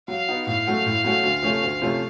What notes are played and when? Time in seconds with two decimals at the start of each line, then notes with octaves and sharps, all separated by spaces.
0.08 F#3 F5
0.28 B3 D#4 F#4
0.47 A2 F5
0.67 F#3 A3 C#4 F#4
0.86 A2
1.04 F#3 A3 C#4 F#4
1.23 D2
1.43 C3 F3 A3 C#4
1.62 D2
1.82 C3 F3 A3 C#4